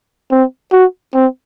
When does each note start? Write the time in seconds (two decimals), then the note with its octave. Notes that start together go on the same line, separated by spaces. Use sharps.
0.31 C4
0.72 F#4
1.14 C4